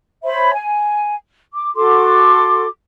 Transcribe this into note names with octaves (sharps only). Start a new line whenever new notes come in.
C5 C#5 E5 B5
G#5
D6
F#4 A4 C6 D6